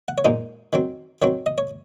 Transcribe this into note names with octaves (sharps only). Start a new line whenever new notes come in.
F#5
C#5
A#2 G#3 D#4 C5
D#3 F#3 C4
D#3 F#3 C4 C#5
D#5
C#5